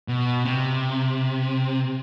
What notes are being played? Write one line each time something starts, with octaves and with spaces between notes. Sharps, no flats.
B2
C3